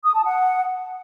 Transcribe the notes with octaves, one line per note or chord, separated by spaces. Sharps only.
D#6
A5
F#5